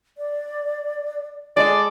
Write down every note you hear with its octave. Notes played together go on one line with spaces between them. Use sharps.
D5
G#3 A4 D5